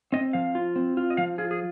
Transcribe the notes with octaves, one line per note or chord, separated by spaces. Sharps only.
C4 D#5
F3 F5
F4
C4
F4
D#5
F3 F5
F4 G#4
G#4